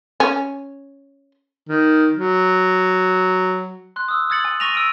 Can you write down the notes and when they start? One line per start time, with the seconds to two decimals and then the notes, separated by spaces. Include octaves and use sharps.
0.20 C#4
1.69 D#3
2.17 F#3
3.96 C6 F#6
4.08 D#6 E6
4.30 D#6 F6 G#6 A6 C#7 F#7
4.45 G#5
4.60 C#6 F6 A#6 D#7 F7
4.74 E6 F6 D7 D#7